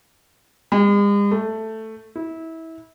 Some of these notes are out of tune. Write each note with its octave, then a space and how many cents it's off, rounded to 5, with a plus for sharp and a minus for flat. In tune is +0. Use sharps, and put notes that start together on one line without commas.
G#3 -45
A3 +5
E4 -25